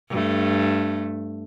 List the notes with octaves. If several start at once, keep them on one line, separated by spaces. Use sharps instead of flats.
G2 A3